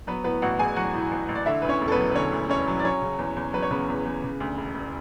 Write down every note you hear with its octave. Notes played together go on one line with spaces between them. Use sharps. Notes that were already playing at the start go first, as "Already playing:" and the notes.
F#3 B3 B4
A2 B3 B4
A1 F#4 F#5
A1 G#4 G#5
F#3 F#4 F#5
A2
A1
A1
D5
D3 E4 E5
D2 B4
C#4 C#5
E1
A4
B3 B4
F#3
B4
D3 C#4 C#5
D2
E1 C#4 C#5
F#3
D5
F#3 C#4 C#5
C#3
E2
E2
F#3 B4
C#5
C#3 B3 B4
E2
E2
C#3
D2
E1
E1